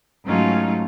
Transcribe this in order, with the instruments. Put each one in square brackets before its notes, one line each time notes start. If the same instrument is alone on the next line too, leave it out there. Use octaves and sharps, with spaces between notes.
[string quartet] G#2 F#3 A3 C#4 D#4 F4